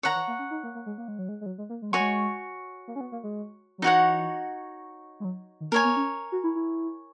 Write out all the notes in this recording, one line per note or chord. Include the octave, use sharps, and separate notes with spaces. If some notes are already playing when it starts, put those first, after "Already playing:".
D#3 C#5 F#5 A#5
E3
A#3
C#4
D#4
A#3
A#3
G#3
A#3
G#3
F#3
G#3
G#3
F#3
G#3
A#3
G#3
F#3 F#4 C#5 G#5 C#6
G#3
A#3
C#4
B3
A#3
G#3
F#3
E3 D#4 F#4 C#5 F#5
G#3
F#3
D#3
A#3 A#4 C#5 G#5
B3
C#4
F#4
E4
E4